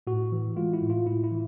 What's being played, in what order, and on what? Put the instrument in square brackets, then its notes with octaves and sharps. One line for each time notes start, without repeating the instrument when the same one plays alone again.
[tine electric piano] A2 F#4
E3
G#3 F4
E4
A2
F4
A2 E4
E4
E3